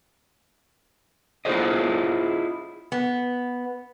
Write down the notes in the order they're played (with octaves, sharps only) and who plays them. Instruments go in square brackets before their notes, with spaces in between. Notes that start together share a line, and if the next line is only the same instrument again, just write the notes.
[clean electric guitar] E4 F4 G4 G#4 C5 D#5
[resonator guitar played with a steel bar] B3